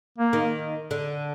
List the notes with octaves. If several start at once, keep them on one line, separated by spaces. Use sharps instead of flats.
A#3
D#3
D3